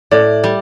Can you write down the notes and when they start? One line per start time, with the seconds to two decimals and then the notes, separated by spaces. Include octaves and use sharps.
0.11 A2 D5
0.44 G3